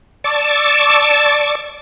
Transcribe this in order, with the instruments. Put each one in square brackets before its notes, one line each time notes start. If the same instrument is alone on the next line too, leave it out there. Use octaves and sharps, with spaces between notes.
[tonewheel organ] D5 A5 C#6 D6 E6